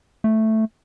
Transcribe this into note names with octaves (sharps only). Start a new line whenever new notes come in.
A3